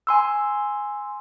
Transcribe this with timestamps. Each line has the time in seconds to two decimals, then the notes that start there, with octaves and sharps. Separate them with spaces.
0.07 G#5 C6 E6